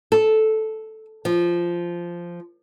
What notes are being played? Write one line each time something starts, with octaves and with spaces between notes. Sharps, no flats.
A4
F3